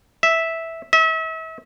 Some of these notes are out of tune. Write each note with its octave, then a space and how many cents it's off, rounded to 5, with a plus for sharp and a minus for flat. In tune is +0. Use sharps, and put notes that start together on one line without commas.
E5 -10
E5 -40